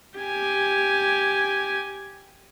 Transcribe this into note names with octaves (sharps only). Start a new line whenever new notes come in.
G4 G#5